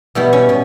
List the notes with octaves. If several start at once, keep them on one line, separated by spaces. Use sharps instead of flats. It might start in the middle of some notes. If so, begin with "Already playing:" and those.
B2 G3 B3 E4
C#4
B2